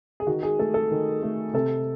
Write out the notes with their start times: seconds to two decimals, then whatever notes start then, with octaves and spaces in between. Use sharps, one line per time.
0.20 G#4
0.27 D#3 F#4
0.43 G#4
0.59 A3 A4
0.74 A4
0.91 D#3
1.22 A3
1.54 C3 A4